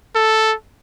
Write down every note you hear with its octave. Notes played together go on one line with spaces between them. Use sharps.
A4